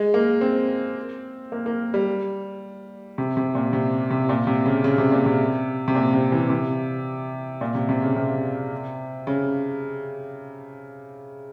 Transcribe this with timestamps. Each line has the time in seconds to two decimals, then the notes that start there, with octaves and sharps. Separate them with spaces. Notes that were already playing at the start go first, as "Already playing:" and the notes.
Already playing: G#3
0.14 A#3
0.41 C4
1.52 A#3
1.66 A#3
1.94 G3
3.18 C3
3.37 C3
3.55 A#2
3.73 C3
4.10 C3
4.29 A#2
4.47 C3
4.66 C#3
4.84 C#3
4.98 C3
5.12 A#2
5.26 C3
5.88 C3
5.95 A#2
6.14 C3
6.32 E3
6.50 C3
7.61 A#2
7.75 C3
7.89 C3
8.02 C#3
8.16 C3
9.27 C#3